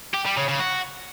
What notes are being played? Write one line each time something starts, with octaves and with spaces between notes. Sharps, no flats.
G4
G3
C#3
C#3
F#4